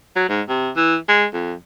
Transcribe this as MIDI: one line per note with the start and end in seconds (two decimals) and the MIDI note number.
0.16 0.24 54
0.29 0.42 44
0.49 0.70 48
0.76 0.96 52
1.08 1.25 56
1.34 1.54 41